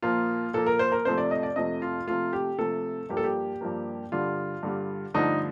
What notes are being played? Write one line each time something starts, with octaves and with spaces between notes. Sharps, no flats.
A#2 F3 A#3 F4
A#2 F3 A#3 A4
A#4
C5
A#4
F2 C3 F3 A3 C5
D5
D#5
D5
F2 C3 F3 A3 D#5
F4
C3 F3 A3 F4
G4
C3 F3 A3 A4
G2 F3 A#3 G4
A4
G4
G2 F3 A#3
G2 D3 G3 F4
G2 D3 G3
G2 D3 F3 A3 D#4